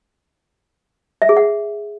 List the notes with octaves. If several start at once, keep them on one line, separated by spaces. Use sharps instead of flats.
E5
G#4
F#5